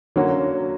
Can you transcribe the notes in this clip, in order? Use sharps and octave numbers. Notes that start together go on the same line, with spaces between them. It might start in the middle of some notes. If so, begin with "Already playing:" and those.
D3 F#3 A#3 C#4 F#4